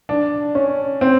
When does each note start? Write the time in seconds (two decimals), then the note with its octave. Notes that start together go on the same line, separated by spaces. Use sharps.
0.09 D4
0.55 C#4
1.01 C4